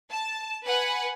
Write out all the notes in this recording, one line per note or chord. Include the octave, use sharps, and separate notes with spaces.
A5
B4 F#5 G#5